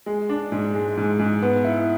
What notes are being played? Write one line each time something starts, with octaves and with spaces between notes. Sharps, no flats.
G#3
D4
G#2
G#3
G#2
G#2
B3
E4